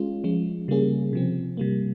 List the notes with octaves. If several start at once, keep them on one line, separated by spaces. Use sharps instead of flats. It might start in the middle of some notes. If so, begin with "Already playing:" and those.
Already playing: G#3 C#4 F4
F3 G#3 C#4
C#3 G3 A#3 C#4 G#4
C3 F3 C4
C3 G3 A#3